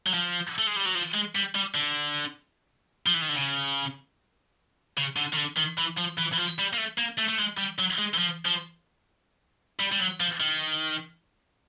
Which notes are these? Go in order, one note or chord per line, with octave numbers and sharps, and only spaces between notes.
F#3
F3
A3
G#3
G3
F#3
F3
G#3
G3
G3
D3
F3
E3
D#3
D3
C#3
C#3
D3
D#3
D3
D#3
E3
F3
E3
E3
F3
G3
A#3
A3
A#3
A3
A3
G#3
G3
F#3
G#3
E3
F3
F3
G3
G3
F#3
F3
D#3